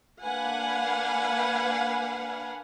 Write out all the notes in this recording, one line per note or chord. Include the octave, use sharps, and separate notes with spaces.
A#3 D4 B4 F5 F#5 G#5